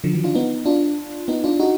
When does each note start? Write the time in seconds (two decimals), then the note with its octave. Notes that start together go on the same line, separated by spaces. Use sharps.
0.04 D3 F3
0.14 D#3 F#3
0.24 D4 F4
0.35 B3 D#4
0.66 D4 F4
1.28 B3 D#4
1.44 D4 F4
1.60 D#4 F#4